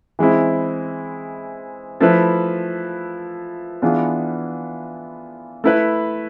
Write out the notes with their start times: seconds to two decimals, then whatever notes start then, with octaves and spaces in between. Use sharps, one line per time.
0.19 E3 G#3 C4 E4
2.01 F3 A3 E4 B4
3.82 E3 B3 D4 F4 G#4
5.64 A3 E4 B4